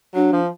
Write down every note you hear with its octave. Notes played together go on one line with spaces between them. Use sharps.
F#3 D4
F3